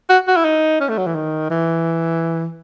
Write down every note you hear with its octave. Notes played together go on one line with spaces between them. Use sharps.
F#4
F#4
E4
D#4
C#4
A3
F#3
E3
D#3
E3